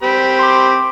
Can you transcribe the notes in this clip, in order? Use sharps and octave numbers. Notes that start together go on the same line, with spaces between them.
C4 G4 B5
C6 D6